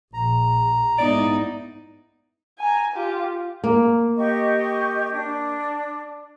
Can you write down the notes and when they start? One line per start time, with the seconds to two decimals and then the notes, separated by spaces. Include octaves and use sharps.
0.14 A#1 A#5
0.98 G#2 B3 D#4 E4 D5
2.59 G#5 A#5
2.95 F4 G4
3.64 A#3
4.17 G4 D#5 C#6
5.12 D4